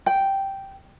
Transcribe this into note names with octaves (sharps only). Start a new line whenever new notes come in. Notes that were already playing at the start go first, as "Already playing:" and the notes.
G5